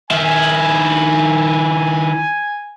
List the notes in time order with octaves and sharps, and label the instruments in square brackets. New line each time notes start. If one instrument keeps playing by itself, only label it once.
[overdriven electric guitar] D#3 E4 [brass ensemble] G#5